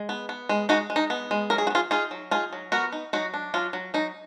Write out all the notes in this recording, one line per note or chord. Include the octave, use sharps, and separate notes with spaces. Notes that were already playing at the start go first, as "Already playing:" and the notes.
Already playing: G#3
B3
B3
G#3
G#3 D#4 F#4
G#3
D#4
B3
G#3
F#3 A#4
G#4
F#4
B3
F4 G#4
D#4 F4 G#4
F#3
D#4 F4 G#4
F#3
B3 F#4 A#4
D#4
F#3 D#4 F#4
D4
F#3 F4
F#3
F#3 D#4